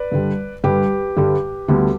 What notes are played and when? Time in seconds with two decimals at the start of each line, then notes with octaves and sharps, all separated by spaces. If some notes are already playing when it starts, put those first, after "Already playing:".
Already playing: B4 D5
0.12 G2 D3 G3
0.64 G2 D3 G3 G4 B4
1.17 G2 D3 G3
1.68 D2 D3 G3 B3